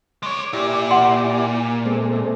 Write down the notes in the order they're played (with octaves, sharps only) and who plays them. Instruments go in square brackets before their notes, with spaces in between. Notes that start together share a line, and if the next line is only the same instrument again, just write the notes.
[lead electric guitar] G#3 C#5 [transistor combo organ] D6
[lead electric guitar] A#2 [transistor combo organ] E4 G4 D5
[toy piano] F#5 C6
[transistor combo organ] G#3 A3 C4